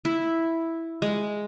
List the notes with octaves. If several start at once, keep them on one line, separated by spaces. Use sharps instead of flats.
E4
G#3